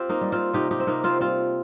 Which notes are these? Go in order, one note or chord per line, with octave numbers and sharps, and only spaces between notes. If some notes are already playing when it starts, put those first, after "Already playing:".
Already playing: C4 F4 G4
A#3 D#4
G3
C4 F4
C3 D#4 G4
D#4 G4
C4
C3 A#3 D#4
C4 F4
G3 C4 F4